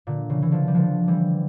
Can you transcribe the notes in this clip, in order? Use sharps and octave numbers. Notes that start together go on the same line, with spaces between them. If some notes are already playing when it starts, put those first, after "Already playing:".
A#2 D3
C#3 E3
E3
D3 F3
G3
D3 F3
E3 G3